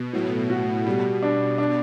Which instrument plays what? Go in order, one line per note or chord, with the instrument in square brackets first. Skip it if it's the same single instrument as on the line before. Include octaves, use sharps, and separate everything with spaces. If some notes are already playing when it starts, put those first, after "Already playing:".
Already playing: [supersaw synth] B2
[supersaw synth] A2 [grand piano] F#3
[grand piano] F#4
[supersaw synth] B2 [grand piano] G3
[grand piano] D4
D4